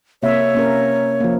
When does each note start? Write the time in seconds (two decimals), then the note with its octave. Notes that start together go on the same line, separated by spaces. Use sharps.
0.23 C3 A#3 C#5 E5
0.55 A#3 C#4 A#4
1.20 F3 A#3